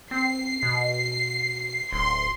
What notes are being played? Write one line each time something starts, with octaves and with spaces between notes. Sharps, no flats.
C4 C7
B2
D1 C6